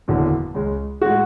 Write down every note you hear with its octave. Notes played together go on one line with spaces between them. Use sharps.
F#1 E2 D3 F#3
C#2 C#3 G#3
A2 G#3 F#4